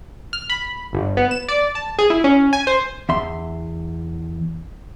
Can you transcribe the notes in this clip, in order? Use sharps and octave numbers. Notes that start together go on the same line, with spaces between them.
F6
B5
G1
B3
E7
D5
A5
G#4
E4
C#4
G#5
C5
E2 E5 C6